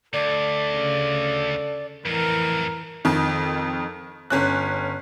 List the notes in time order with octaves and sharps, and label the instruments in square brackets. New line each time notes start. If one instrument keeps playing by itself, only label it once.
[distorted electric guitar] D2 [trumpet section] A4 [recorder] D5
[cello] C#3
[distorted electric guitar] F2 A2 [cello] E3 [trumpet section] A#4
[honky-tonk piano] F2 D#3
G1 C#4 F#6